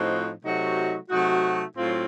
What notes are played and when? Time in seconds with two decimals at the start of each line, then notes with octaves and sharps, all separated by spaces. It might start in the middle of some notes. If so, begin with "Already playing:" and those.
Already playing: A2 F3 C4 D#4 F#4
0.43 C3 F#3 A3 D#4 F#4
1.09 C3 F#3 A3 D#4 F#4
1.76 A2 F#3 C4 F4